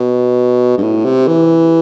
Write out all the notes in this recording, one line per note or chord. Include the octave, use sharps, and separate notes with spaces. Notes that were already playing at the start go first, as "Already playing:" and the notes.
Already playing: B2
G2
A2
C3
E3